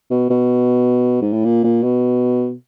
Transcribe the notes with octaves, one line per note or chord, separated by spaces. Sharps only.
B2
B2
G#2
A2
A#2
A#2
B2